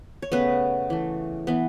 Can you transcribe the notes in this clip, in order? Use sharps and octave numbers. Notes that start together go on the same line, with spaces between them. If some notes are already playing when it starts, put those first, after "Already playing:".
C#5
C#3 A3 B3 B4
E3 A3
E3 B3